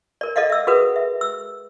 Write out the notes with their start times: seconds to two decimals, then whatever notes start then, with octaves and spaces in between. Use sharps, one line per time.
0.21 A#4 D5
0.36 A4 D5 D#5 F5 F#5
0.50 E5 E6
0.67 F#4 G#4 A#4 B4 F#5 D#6
0.96 E5
1.21 E6